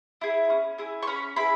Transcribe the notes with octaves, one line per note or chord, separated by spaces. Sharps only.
E4 G#4
C#4
E4 G#4
C#6
C#4 B5
E4 G#4 B5